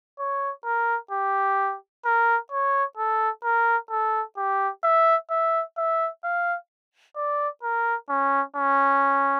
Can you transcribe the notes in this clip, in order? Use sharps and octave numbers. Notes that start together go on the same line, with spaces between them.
C#5
A#4
G4
A#4
C#5
A4
A#4
A4
G4
E5
E5
E5
F5
D5
A#4
C#4
C#4